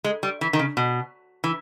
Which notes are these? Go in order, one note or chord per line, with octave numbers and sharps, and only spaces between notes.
G#3
G3
E3
D#3
C#3
B2
E3